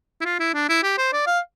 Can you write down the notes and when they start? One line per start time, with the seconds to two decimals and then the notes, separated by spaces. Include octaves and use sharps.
0.21 E4
0.25 F4
0.40 E4
0.54 D4
0.69 E4
0.83 G4
0.98 C5
1.13 D5
1.27 F5